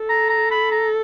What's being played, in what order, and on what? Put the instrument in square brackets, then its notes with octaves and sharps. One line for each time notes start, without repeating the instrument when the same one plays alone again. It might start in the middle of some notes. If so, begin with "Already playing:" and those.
Already playing: [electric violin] A4
[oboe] A#5
A#5
B5
A#5